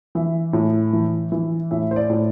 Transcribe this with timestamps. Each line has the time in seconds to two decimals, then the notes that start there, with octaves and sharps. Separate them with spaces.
0.15 E3 E5
0.53 A2
0.93 E3
1.32 E3
1.71 A2 E5
1.91 C5
1.96 D5
2.10 A2